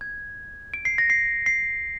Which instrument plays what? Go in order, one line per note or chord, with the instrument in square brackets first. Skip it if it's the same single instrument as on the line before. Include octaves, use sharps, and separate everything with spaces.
[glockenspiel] G#6
D7
C7
A#6
C7
C7